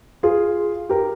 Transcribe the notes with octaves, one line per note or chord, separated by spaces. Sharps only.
F4 G#4
G4 A#4